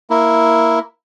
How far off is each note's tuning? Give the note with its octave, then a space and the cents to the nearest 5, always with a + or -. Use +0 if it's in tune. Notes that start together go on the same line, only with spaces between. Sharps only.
A#3 +0 E4 +0